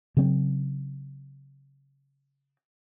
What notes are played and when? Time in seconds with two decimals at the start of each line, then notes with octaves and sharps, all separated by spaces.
0.17 C#3 F#3 C4